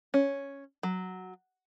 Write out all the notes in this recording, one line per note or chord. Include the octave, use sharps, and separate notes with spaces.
C#4
F#3